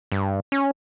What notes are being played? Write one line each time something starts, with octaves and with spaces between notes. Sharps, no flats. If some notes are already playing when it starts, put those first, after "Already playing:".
G2
C#4